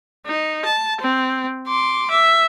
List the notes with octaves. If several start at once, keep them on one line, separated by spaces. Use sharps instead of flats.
D#4
A5
C4
C6 D6
E5